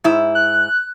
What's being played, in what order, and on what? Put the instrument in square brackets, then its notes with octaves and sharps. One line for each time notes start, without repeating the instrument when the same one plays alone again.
[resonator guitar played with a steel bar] G#2 E4
[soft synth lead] F#6